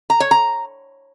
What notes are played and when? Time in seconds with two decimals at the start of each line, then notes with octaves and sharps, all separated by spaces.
0.10 A#5
0.20 C#5
0.31 A#5